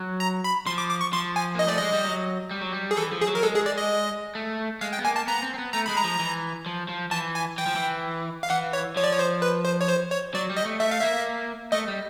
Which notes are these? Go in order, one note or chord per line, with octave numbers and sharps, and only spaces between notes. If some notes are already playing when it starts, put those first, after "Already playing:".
Already playing: F#3
A#5
B5
F3 C6
D6
D6
C#6
F3 C6
G#5
A#3 D#5
A3 D5
G#3 D#5
G3
F#3
G3
F#3
G3
G#4
E3 A4
F3
G#4
F#3
A#4
G#3 A4
G#4
D5
D#5
A3
G#3 F5
G5
B3
A#3 G#5
A5
B3 A#5
C4
C4
B3
A3 A#5
G#3 B5
A#5
F3
E3
F3
F3
E3 A5
G#5
E3 G5
F3
E3
F5
E3 F#5
C#5
F3 C#5
D5
C#5
C5
B4
C5
C#5
C5
C#5
F#3 D5
G3
D#5
A3
A3 E5
F5
A#3 E5
A3 D#5
G3